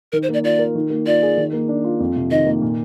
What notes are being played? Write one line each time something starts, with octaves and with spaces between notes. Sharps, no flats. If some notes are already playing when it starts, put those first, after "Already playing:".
D#3 A#4
C5
A#3 D5
F4 D5
A#4
D#3
A#3
F4 D5
G#4
D#3
A#3
D4
F4
F2
C3
D#3 D#5
A#3
A#2